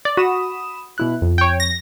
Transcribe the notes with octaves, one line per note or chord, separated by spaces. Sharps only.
D5
F#4 B5 D#6 E7
B2 E4 F#6
F2
C#5 G5
A#6